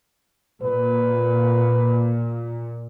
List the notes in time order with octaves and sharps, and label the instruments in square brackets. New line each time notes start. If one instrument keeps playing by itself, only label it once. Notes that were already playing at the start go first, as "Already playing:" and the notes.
[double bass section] A#2 [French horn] B4